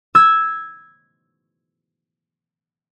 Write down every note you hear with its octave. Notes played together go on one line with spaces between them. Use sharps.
E6 G#6